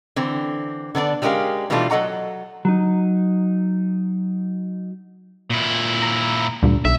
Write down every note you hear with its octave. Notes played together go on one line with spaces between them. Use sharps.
D3 E3 C4
D3 B3 D4 D5
G3 G#3 C#4 G4 A#4 F5
B2 E3 G3 A3 D4 F4
F#3 A4 D#5 F#5 A#5
F#3 D#4
A#2 E4
A#5
D2 G2 A#2
B1 E5